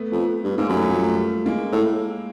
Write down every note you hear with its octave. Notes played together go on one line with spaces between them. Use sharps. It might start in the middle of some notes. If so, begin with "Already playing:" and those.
Already playing: A3 B3
F2
G2
G#2 A#3
F#2 G3 A3
F3 G3
G3 A3
G#3 A#3
A2